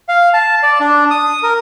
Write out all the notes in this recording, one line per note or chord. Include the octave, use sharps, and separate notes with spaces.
F5
A5
D5
D4
D#6
A#4